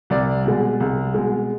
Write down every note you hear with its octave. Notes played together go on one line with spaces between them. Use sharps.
C2 D5
B2 G#3
C2
B2 G#3